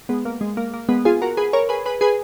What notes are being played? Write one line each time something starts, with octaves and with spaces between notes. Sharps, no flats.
G#3 B3
A#3
G#3
A#3
A#3
G#3 B3
F4 G#4
F#4 A#4
G#4 B4
A#4 C#5
G#4 B4
G#4 B4
G#4 B4